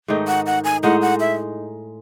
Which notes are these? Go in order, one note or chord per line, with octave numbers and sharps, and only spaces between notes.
G#2 D#3 A3 D#4
F#5
F#5
G#5
A2 G#3 D#4 F#5
F#5
E5